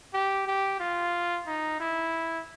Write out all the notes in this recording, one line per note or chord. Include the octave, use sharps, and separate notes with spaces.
G4
G4
F4
D#4
E4